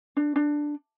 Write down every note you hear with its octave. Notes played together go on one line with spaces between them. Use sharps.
D4
D4